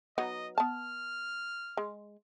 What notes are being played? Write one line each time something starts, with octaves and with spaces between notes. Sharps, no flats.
F#3 B3 D#4 D#5
B3 A5 F6
G#3